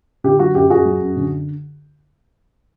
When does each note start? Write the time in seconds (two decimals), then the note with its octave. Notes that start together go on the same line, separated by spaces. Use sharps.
0.24 D3 G4
0.39 F#3 F#4
0.54 F#2 G4
0.70 F#2 F#4 G#4
0.85 F#3
1.01 F#2
1.16 D3